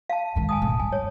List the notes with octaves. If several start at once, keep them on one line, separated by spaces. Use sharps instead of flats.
F5 A5
G#2 D#3
G#5 A5 D#6
E1 A2
G2 G#5
C#5